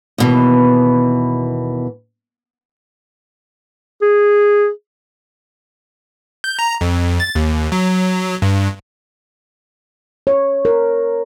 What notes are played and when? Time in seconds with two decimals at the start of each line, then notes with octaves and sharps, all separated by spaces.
0.18 D#2 B2 E3
4.02 G#4
6.44 G6
6.59 A#5
6.81 F2
7.20 A6
7.35 D#2
7.72 F#3
8.42 G2
10.27 C#5
10.65 A#4